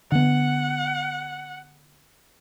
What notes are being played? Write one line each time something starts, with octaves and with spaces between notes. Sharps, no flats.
D3 B3 F#5